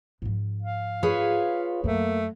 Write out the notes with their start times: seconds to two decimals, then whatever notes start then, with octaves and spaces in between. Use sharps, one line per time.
0.22 G#2 F3
0.62 F5
1.03 F4 G#4 B4 C#5
1.84 F#2 F#3 A3 A#3